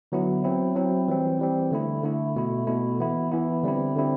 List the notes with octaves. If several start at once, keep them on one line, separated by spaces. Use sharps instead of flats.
D3 F#3 B3 E4
F#3 C4 E4
F#3 C4 E4
E3 G3 C4
E3 G3 C4
D3 A3 E4
D3 A3 E4
B2 A3 E4
B2 A3 E4
E3 B3 E4
E3 B3 E4
D3 G3 C4 E4
D3 G3 C4 E4